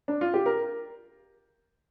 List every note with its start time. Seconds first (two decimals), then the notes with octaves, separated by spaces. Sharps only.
0.08 D4
0.21 F4
0.34 G4
0.46 A#4